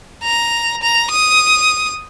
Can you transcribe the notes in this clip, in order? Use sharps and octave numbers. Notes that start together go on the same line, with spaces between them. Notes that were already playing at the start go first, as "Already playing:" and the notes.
A#5
A#5
D#6